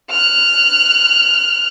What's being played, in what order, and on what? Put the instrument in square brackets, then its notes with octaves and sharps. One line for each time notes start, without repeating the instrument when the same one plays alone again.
[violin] F6 F#6